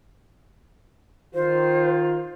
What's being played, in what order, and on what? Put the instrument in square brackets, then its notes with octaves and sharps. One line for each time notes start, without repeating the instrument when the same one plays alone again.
[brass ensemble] D#3 F4 [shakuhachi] C5